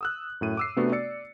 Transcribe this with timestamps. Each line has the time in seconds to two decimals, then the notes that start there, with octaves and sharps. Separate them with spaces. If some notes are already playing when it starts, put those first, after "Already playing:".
0.01 D#6 E6 F#6
0.41 F#2 A2 D#7
0.57 D6 E6 C7
0.76 C3 A3 B3 D4 F#4
0.92 D5 E6 A6 C#7